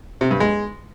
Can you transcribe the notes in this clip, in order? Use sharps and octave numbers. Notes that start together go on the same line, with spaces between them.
C3
G2
G#3